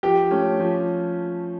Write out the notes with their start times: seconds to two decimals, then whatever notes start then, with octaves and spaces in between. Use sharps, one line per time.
0.03 F3 G4
0.31 A3 C#4
0.60 F3